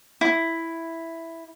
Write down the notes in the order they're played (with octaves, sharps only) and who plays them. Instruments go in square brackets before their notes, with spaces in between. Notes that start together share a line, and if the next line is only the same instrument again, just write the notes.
[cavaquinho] E4